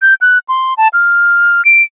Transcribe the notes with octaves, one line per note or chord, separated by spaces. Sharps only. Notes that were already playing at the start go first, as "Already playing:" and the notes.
G6
F#6
C6
A5
F6
D7